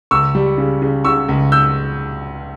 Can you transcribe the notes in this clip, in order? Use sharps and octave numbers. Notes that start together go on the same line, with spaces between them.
C#2 C#6 E6
G3
C#3
C#3
C#3 C#6 E6
C#2
E6 G6